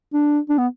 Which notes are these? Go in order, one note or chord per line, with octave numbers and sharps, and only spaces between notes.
D4
D4
B3